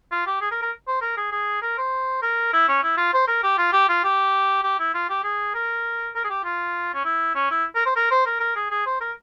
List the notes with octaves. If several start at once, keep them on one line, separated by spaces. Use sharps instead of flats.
F4
G4
G#4
A#4
A#4
C5
A#4
G#4
G#4
A#4
C5
A#4
E4
C#4
E4
F4
C5
A#4
G4
F4
G4
F4
G4
G4
E4
F4
G4
G#4
A#4
A#4
G#4
G4
F4
C#4
E4
C#4
E4
A#4
C5
A#4
C5
A#4
A#4
G#4
G#4
C5
A#4